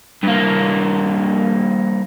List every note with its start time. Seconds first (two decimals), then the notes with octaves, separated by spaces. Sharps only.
0.23 G2 A#3